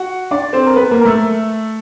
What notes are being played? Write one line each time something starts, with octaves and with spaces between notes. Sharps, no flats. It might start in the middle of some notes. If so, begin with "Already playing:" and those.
Already playing: F#4 F#5
D4 D5
C4 C5
A#4
B3 B4
A#3 A#4
A#4
A3 A4